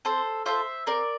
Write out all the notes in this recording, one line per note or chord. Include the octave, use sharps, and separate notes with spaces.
C4 A4 C5
F4 A4 C5 E5
C4 A#4 D5